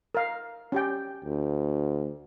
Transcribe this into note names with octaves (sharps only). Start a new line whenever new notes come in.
A#4 F5
C#4 G4 G5
D2